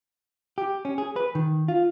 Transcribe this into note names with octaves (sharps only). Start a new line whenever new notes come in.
G4
C#4
G#4
B4
D#3
F4